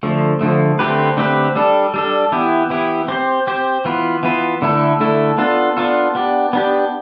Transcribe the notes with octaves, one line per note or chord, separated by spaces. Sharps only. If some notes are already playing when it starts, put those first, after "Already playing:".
D3 F3 A3
D3 F3 A3
D3 A3 C4 G4 B4
D3 A3 C4 G4 B4
G3 D4 A4
G3 D4 A4
E3 B3 E4 G4
E3 B3 E4 G4
C4 G4 C5
C4 G4 C5
E3 B3 F4 B4
E3 B3 F4 B4
D3 A3 E4 A4
D3 A3 E4 A4
B3 D4 F4 A4
B3 D4 F4 A4
B3 D4 G4
B3 D4 G4